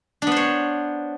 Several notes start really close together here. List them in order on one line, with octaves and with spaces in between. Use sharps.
D4 B3 C5 C#5